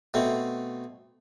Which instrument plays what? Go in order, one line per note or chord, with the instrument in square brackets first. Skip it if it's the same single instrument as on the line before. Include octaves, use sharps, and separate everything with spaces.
[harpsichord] B2 A3 C4